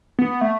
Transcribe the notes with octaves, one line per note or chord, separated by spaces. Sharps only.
B3
A3